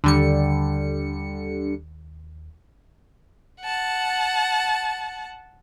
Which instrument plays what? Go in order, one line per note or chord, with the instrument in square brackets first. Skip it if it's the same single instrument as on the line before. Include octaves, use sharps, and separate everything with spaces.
[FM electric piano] D#2 [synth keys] D3 G3 C#7
[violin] F#5 A5